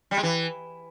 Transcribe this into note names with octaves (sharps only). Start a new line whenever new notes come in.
G3
G#3
E3